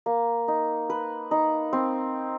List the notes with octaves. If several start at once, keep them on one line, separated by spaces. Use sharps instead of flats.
A#3
D#4
B4
D#4
C4